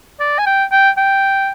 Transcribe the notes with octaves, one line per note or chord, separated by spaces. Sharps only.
D5
G#5
G5
G5
G5